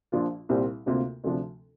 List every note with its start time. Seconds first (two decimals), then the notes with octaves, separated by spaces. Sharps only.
0.12 A#1 A#2 F3 D4 F4
0.49 C2 A#2 G3 C4 G4
0.86 D2 C3 A#3 F4 A#4
1.24 D2 C3 F3 D4